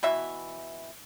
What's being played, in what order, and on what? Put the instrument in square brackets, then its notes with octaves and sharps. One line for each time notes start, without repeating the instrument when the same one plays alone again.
[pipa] B2 E3 E5